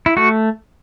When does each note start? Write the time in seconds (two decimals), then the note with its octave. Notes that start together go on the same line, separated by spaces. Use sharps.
0.06 E4
0.17 A3 F#4